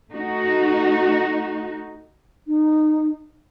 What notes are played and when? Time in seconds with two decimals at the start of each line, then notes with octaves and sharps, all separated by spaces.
0.11 A3 D#4 F#4
2.48 D#4